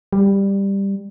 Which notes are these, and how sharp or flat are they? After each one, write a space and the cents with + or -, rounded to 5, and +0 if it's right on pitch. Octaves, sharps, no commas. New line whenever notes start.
G3 +10